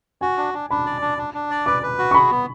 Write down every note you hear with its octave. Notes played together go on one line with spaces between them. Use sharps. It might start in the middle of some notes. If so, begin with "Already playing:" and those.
F#4 G#5
D4
D4
D4 B5
D5
D4
D4
D4
D5
B4 D6
B4
F#4
C#6
G#4 B5
B3